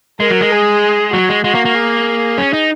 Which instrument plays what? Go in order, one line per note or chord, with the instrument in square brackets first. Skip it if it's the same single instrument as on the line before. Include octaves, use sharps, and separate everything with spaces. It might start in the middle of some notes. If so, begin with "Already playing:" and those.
[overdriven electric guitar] G#3 [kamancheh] A#4
[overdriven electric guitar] F#3
G#3
[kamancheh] G#4
[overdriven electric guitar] F#3 [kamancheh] F#4
[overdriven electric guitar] G#3
[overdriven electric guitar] G#3 [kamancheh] F#4
[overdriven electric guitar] A#3
A#3
[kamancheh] G#4
[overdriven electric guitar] C#4
D#4